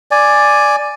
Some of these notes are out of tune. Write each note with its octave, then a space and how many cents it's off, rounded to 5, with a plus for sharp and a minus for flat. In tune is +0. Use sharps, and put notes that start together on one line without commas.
D5 +5 G#5 +0